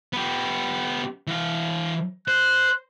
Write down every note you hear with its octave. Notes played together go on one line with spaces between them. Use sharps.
B3 G4
E3 F5
C5 F#6